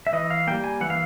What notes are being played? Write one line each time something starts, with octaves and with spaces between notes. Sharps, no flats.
E5
E3 D#5
F5
G3 A#3 G5
G#5
E3 F#5
F5